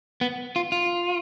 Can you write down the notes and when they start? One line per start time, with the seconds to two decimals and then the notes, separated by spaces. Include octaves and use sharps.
0.21 B3
0.56 F4
0.72 F4